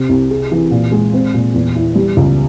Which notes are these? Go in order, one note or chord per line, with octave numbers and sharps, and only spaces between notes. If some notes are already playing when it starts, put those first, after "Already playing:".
Already playing: C3
C2
G#4
E3
A#2
G#3
C4
A#2
E2
E4
G3
C#2